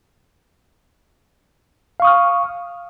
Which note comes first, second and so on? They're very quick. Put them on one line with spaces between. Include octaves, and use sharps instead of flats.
F5 C#6 D#6 F6